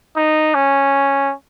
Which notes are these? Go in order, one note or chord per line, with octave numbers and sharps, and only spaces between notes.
D#4
C#4